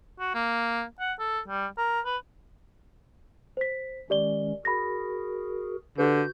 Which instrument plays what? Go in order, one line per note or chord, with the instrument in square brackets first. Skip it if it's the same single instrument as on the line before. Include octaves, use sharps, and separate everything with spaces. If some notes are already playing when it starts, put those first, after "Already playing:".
[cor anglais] F#4
A#3
F#5
A4
G3
A#4
B4
[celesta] C5 B6
[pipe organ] D#3 G#3 C#4 [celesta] G4 D5 G7
[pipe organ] F#4 G#4 A#4 [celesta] B5 A#6
[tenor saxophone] D3 [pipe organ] F#4 G6 [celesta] G4 B4